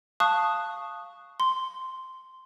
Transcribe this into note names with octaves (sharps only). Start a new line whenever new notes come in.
F5 A5 C#6 D#6 F#6
C6